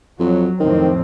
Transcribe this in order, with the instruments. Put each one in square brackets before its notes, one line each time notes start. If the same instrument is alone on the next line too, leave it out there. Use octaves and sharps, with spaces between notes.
[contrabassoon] F2 [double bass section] F#3
[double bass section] F2 A2 C4 [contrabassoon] D#3